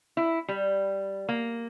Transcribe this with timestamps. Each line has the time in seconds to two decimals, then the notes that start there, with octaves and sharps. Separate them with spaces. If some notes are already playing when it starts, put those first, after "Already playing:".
0.17 E4
0.48 G3
1.29 A#3